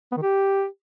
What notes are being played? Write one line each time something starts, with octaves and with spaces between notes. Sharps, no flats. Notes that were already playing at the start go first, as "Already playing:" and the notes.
B3
D#3
G4